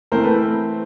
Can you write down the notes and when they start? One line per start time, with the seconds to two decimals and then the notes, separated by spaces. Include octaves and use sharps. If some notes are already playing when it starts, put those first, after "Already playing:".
0.12 E3 A3 C4 A#4 C5
0.23 A4 B4